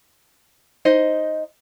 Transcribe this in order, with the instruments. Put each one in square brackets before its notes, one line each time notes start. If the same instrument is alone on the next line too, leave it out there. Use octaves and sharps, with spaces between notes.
[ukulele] D#4 C5 D#5